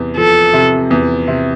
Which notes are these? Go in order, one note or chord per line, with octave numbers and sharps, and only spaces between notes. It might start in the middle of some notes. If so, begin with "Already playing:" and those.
Already playing: E2 C3
F3 A4
C3
E2
C3